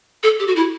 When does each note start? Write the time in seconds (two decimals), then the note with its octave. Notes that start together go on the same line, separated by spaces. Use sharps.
0.23 A4
0.39 G4
0.47 F#4
0.56 E4